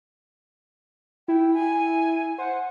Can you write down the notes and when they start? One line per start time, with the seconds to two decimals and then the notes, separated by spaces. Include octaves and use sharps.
1.28 E4 G5
1.54 G#5
2.38 C5 F#5